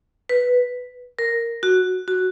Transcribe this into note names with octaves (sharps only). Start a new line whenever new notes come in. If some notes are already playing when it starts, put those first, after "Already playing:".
B4
A#4
F#4
F#4